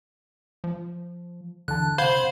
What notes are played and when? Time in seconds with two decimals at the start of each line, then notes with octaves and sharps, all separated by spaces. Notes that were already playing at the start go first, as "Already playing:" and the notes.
0.64 F3
1.68 D2 D3 E3 A5 F#6
1.98 C3 C5 F5 F#5 B5 G#6